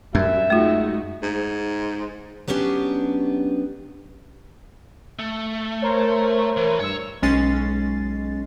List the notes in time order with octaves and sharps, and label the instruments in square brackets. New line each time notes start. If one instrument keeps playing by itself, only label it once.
[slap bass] F#2 [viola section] G3 [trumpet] E5
[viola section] G#3 D#4 F#4 [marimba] A3 F4
[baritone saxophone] G#2
[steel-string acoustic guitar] F#3 B3 C#4 D4 G4
[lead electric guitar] A3
[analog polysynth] A#4 C5 C#5
[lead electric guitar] E3
[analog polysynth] G2 E6 [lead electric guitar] C#5
[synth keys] B1 G#3 C#4 A6 C7